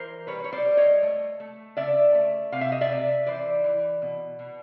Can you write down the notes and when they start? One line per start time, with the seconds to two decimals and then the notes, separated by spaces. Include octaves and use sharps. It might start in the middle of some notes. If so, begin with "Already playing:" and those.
Already playing: E3 A#4 C5
0.27 G3 B4 C#5
0.44 C#5
0.53 C5 D5
0.64 G3
0.77 C#5 D#5
1.03 A3
1.40 A3
1.77 C#3 D5 E5
2.15 A3
2.52 C3 F5
2.61 E5
2.72 D#5
2.81 D5 E5
2.90 C3
3.26 E3 C5 D5
3.64 E3
4.02 B2
4.39 B2